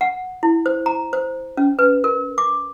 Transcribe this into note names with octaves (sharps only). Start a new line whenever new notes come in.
F#5
E4
C5
A#5
C5
C#4
B4
A#4
D6